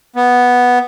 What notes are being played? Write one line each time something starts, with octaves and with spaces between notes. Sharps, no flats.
B3